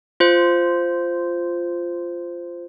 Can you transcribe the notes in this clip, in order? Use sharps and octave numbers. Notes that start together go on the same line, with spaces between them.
F4 C5